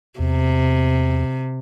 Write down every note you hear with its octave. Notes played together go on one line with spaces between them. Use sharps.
E2 C3